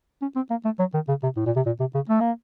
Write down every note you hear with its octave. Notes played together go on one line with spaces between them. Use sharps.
C#4
C4
A#3
A3
F#3
D#3
C#3
C3
A2
A#2
C3
A#2
C3
C#3
A3
A#3